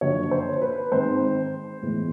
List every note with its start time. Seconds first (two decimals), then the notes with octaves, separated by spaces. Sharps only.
0.01 F#2 D3 F3 A#3 C#5
0.31 C5
0.62 B4
0.92 G#2 D#3 G#3 C4 C5
1.82 A2 E3 G#3 B3